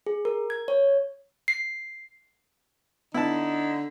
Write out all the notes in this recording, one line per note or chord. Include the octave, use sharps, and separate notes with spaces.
G#4
A#4
G#6
C#5
C7
D3 B3 D#4 E4 A5